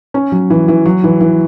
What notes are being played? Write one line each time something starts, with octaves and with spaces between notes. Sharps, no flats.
C#4
F#3
E3
E3
F#3
E3
E3